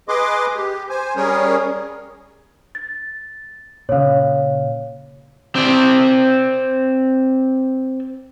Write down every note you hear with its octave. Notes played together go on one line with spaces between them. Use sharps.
G#4 B4 D#5 C6 D6
G4
C5 G#5
G3 C#4 G#4 A#4 C#5
A6
A#2 C#3 C#5 F5
C4 D5